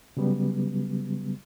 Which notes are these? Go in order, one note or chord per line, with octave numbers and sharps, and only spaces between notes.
C#3 F#3 G3 B3